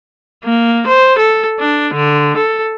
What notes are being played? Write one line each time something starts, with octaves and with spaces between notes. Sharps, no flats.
A#3
C5
A4
D4
D3
A4